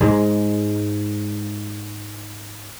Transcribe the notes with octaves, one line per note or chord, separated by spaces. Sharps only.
G#2 G#3